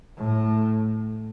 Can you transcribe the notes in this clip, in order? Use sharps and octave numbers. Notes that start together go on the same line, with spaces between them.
A2